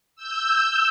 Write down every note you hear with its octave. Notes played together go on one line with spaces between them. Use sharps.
E6 G6